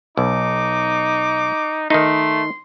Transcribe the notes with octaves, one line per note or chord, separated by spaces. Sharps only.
B1 D#4 D6
D#3 A3 D#4 C6